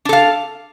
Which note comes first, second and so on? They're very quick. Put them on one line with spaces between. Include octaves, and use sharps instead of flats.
D4 A4 F5